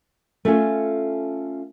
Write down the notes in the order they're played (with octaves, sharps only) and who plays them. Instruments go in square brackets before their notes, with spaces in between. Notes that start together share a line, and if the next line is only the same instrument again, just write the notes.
[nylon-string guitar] A3 C#4 F4 A4 G#5